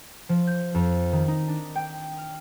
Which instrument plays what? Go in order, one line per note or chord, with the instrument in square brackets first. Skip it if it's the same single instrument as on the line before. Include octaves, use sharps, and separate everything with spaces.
[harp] F3
G6
F2
D#3
D#4
D4
G5
F6